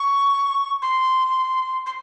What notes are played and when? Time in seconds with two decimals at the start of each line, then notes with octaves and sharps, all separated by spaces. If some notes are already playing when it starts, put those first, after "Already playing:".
Already playing: C#6
0.82 C6
1.86 C6